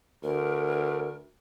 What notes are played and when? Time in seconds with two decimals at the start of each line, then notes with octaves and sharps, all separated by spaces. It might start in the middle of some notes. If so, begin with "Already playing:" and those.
0.23 D2 A#4